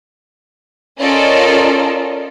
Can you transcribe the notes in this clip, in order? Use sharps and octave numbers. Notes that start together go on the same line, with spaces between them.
C#4 F4 A4 A#4 D5 D#5